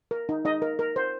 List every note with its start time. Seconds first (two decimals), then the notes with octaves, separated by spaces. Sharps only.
0.11 A#4
0.29 D#4
0.45 D#4 D#5
0.62 A#4
0.79 A#4
0.96 C5